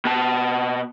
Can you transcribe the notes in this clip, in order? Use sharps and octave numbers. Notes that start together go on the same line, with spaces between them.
B2 A5